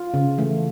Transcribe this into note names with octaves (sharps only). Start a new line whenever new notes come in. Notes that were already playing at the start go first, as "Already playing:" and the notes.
Already playing: F4
C#3
E3 A3